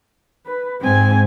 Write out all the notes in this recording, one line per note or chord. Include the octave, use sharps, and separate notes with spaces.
B4
G#2 C4 G#5